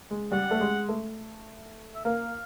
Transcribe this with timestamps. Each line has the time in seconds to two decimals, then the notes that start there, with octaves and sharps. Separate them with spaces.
0.11 G#3
0.32 G3 F#5
0.51 A3
0.61 G#3
0.89 A3
1.95 E5
2.05 A#3 F5